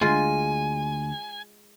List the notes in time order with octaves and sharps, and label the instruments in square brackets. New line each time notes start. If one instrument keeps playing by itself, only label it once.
[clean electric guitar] D2 [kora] G#3 [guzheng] F4 [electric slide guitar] G#5